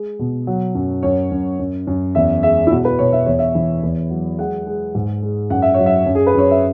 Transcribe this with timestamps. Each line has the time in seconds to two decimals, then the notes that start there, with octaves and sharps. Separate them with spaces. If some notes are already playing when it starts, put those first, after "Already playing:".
Already playing: G#3
0.19 B2
0.47 F#3
0.75 F#2
1.03 F#2 C#5
1.31 F#2
1.59 F#2
1.87 F#2
2.15 E2 E5
2.43 G#3 E5
2.67 E4
2.71 B2 F#4
2.85 B4
2.99 B2 C#5
3.13 E5
3.26 E2 C#5
3.39 E5
3.55 E3
3.83 E2
4.10 F#3
4.38 G#3 F#5
4.67 G#3
4.95 G#2
5.22 G#3
5.50 F#2 F#5
5.62 E5
5.74 F#3 C#5
5.86 E5
6.06 F#2
6.15 G#4
6.27 B4
6.34 F#2 C#5
6.51 E5